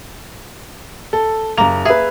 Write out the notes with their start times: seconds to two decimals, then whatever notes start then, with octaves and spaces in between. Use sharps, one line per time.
1.13 A4
1.58 F#1 A#3 F7
1.85 G#4 B4 E5